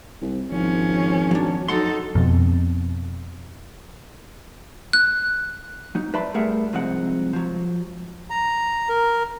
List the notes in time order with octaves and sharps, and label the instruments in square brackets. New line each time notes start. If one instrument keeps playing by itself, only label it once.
[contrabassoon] C2
[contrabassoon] G#1 [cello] F3 C#4
[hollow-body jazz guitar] F#3 D4
[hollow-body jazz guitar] F#3 F#5 C6 [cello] D#4 A4
[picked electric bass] F2 B2
[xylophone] F#6
[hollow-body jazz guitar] F#3 D#4
B4 D5 E5 A5 B5 C6
G3 A3 G#4 A#4 E5 F#5
C2 F3 G#3 C4 D#4 F#5
F3 F#3
[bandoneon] A#5
A#4